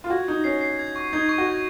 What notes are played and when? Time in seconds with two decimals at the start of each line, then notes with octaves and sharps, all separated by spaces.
0.04 F4
0.10 F#4 G#6
0.28 D#4 G#6
0.44 C#4 C7
0.61 C7
0.79 G#6
0.96 C#6
1.13 D#4 G#6
1.29 C#6
1.38 F#4
1.47 G#6